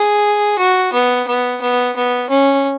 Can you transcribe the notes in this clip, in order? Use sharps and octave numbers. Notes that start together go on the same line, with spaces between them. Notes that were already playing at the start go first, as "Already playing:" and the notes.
Already playing: G#4
F#4
B3
B3
B3
B3
C#4